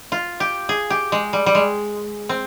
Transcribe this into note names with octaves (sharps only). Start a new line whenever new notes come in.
F4
G4
G#4
G4
G#3
G3
G3
G#3
C4